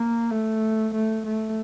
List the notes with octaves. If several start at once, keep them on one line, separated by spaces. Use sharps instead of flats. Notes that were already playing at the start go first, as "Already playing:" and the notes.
Already playing: A#3
A3
A3
A3